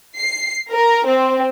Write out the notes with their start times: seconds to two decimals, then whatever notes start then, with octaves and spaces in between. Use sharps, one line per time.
0.17 C7
0.71 A#4
1.07 C4